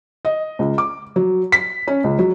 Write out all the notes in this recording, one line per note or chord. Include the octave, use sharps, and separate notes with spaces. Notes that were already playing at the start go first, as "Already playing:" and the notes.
D#5
C#2
D6
F#3
B6
C#4
C#2
F#3